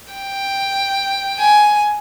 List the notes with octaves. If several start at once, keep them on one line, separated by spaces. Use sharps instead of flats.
G5
G#5